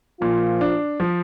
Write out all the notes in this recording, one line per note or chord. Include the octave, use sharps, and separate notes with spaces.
A#2 F3 F4
D4
F3